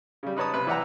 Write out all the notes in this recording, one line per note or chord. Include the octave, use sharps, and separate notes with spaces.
C#3 G3
D#4 B4 C#5 A5 D#6
C3 B4
E3 D5 E5 F#5 G5 A#5